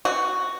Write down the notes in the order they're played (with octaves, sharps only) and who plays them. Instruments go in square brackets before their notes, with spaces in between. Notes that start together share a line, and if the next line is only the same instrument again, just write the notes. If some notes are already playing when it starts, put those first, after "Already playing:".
[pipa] F#4